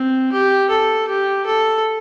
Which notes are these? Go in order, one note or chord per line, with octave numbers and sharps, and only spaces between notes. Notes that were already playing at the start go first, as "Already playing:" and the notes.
Already playing: C4
G4
A4
G4
A4